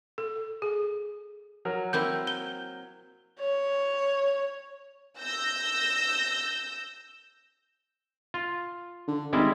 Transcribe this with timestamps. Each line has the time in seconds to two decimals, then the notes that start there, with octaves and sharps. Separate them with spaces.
0.18 A4
0.62 G#4
1.65 F#3 A#4
1.93 A#3 C4 E4 G6
2.27 G6 G7
3.39 C#5
5.18 E6 G6 A#6
8.34 F4
9.08 D3
9.33 G#1 G3 G#3 E4